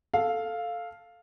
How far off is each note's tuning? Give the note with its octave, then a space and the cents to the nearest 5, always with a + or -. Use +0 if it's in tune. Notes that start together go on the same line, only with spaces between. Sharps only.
A4 +0 F5 +0